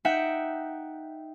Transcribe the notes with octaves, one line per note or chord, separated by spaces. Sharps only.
D#4 E5 F#5 G5